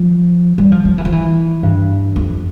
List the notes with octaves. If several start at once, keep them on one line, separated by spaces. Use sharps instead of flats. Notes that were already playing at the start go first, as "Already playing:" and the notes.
Already playing: F3
G3
F3
F3
E3
F3
E3
G2
F2